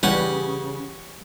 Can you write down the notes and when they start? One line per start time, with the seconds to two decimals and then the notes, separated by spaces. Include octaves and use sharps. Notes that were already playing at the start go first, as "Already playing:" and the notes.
0.03 C#3 E3 G3 C#4 G4 B4 F#5